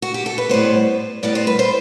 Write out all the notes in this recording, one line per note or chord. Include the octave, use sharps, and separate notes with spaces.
F#4
G4
A4
B4
A2 G3 B3 C5
A2 G3 B3 D5
C5
B4
C5